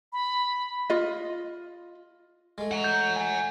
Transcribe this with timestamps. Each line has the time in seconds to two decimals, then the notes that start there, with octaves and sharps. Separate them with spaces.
0.13 B5
0.90 F4 D#5
2.58 G#3 A3
2.71 F#5 A#5
2.84 G6
3.16 G#5